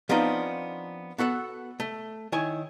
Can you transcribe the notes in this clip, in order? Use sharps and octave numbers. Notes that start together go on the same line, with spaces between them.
F3 B3 C4 D4 D#4 F4
B3 F#4 A4 F#5
A3
D#3 E4 C#5 G#5